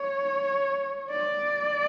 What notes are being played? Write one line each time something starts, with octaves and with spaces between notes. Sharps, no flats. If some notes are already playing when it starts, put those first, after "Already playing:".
Already playing: C#5
D5